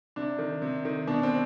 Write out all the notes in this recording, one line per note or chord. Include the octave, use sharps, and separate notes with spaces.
C3 D4
D#3
C3
D#3
B2 D4
C4